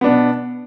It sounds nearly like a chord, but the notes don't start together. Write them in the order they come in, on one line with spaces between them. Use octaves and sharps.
B3 D4 B2